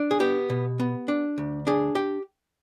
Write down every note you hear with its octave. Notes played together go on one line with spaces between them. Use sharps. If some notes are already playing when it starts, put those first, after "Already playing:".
Already playing: D4
G#4
B3 G4
B2
B3
D4
D2
D4 G#4
G4